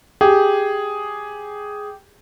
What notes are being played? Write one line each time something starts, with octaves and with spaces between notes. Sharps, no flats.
G4 G#4